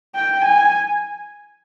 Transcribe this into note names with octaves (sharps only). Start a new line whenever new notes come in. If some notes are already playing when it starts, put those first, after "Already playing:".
G5
G#5